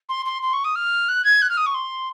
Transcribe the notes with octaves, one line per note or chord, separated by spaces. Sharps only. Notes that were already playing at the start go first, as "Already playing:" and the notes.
C6
C6
C6
C#6
D#6
F6
F#6
G#6
F#6
F6
D#6
C#6
C6